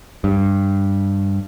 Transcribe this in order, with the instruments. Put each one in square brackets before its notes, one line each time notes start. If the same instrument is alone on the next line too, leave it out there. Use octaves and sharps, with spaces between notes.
[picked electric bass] G2